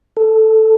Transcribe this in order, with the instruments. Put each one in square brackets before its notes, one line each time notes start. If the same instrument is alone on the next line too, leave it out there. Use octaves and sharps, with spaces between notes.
[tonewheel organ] A4